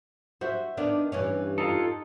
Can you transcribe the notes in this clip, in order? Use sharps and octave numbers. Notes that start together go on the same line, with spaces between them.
F#4 C5 E5
D#3 B3 D4
G2 E3 C#4
D#4 F4 A4